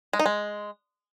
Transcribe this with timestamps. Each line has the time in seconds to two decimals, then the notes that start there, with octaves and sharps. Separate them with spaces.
0.13 G#3
0.19 D#4
0.26 G#3